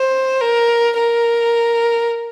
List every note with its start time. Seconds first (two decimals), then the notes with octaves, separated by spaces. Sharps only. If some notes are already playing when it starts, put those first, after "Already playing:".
Already playing: C5
0.41 A#4
0.96 A#4